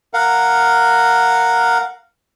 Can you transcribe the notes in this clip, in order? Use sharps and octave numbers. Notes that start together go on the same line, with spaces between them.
A#4 F5 F#5